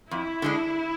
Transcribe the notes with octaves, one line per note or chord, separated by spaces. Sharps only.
F2 E4
D3 G#3 D4